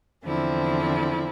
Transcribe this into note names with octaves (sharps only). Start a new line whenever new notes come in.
E2 D3 F3 C4 E4